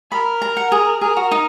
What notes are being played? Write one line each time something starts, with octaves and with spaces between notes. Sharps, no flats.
A#4 B5
A#5
F#5
G#4
G#4 A#4
F#4
D#4